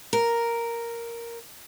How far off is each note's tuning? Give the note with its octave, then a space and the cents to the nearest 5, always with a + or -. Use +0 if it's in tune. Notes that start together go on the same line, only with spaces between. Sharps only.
A#4 +0